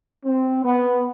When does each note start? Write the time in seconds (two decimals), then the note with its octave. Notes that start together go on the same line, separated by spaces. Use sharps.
0.25 C4
0.65 B3